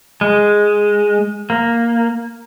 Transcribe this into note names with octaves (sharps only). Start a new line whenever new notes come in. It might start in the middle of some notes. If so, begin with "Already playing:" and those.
G#3
A#3